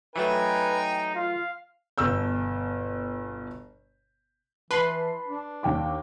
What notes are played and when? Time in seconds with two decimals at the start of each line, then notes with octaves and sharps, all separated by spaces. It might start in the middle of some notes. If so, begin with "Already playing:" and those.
0.16 E3 F#3 A3 D#4 B4 G5 G#5
1.15 F4 F5
1.98 G1 B2 E6 G6
4.71 E3 B4 A5 B5 C6 C7
5.27 D4
5.63 D#2 G5 D6